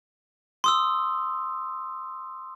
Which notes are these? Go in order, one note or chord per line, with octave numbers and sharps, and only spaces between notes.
C6 D#6 E6